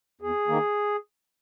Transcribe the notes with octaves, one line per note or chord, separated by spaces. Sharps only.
E2 G#4
D#3 A#3